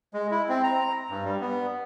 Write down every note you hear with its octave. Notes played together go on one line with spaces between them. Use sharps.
G#3
E4
C4
A#5
G2
G3
B3